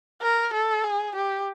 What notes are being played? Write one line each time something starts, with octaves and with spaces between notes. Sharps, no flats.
A#4
A4
G#4
G4